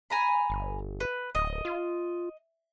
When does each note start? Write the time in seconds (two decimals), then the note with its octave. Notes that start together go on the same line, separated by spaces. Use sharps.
0.10 G#5 A#5 B5
0.50 G1
1.00 B4
1.35 D1 D#5
1.65 F4